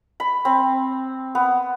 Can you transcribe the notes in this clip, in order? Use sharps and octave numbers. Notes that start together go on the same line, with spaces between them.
B5
C4
B3